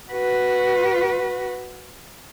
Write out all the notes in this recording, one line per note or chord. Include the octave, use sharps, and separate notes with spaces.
F#4 B4